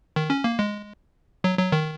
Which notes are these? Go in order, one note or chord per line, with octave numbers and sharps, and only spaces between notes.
D#3
C#4
A#3
G#3
F#3
F#3
D#3